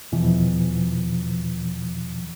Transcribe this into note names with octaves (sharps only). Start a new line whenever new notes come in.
E2 B2 E3 F3